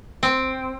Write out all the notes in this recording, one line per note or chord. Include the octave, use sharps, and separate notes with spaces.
C4